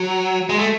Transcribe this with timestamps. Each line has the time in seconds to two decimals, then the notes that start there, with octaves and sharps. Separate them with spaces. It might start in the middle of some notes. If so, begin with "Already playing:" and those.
Already playing: F#3
0.49 G#3
0.59 A3